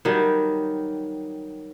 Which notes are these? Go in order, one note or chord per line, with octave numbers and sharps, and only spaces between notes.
D#3 F#3 G3